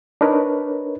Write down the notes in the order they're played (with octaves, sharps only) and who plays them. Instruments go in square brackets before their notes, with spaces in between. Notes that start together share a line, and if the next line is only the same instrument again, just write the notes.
[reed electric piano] D4 D#4 A#4 B4 C#5